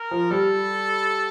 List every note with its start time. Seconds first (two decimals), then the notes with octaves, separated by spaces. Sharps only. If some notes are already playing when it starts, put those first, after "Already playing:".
Already playing: A#4
0.11 F3
0.30 G3 A4